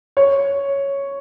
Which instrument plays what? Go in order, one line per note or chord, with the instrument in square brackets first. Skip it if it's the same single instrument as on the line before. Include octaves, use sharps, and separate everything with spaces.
[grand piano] C#5